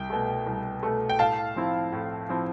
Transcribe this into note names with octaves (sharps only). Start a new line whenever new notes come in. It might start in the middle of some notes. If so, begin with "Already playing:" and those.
Already playing: C2 G5
B2 A3
C2
B2 A3
G5
A2 F5 A5
F3 C4 E4
A2
F3 C4 E4